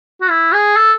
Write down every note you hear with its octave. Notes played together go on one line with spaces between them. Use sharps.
F#4
E4
G#4
A4